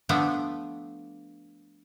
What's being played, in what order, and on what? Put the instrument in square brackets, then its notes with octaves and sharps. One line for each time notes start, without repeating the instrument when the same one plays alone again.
[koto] F3 A3 B3 D4